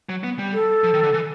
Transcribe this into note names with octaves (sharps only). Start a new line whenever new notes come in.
F#3
B3
G3
A4
F3
D#3
D3
E3